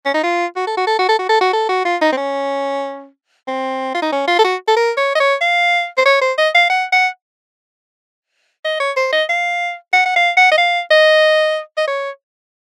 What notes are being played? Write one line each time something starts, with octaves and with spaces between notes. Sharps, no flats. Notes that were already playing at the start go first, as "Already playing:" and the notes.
C#4
D#4
F4
F#4
A4
F#4
A4
F#4
A4
F#4
A4
F#4
A4
F#4
F4
D#4
C4
C#4
C4
F4
D#4
C#4
F4
A4
F#4
A4
A#4
C#5
D#5
C#5
F5
C5
C#5
C5
D#5
F5
F#5
F#5
D#5
C#5
C5
D#5
F5
F#5
F#5
F5
F#5
D#5
F5
D#5
D#5
C#5